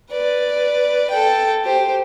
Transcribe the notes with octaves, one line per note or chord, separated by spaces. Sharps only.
B4 D5
A4 G5
G4 C5